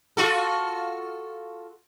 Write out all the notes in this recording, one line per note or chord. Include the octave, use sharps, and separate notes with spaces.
F4 F#4 A4